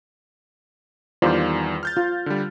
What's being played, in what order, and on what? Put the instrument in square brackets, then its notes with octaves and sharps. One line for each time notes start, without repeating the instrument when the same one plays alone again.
[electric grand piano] E2 D#3 G3 [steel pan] F4 C5 D5
[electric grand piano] F6 G6 A6
[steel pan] F4
[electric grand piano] D3 G3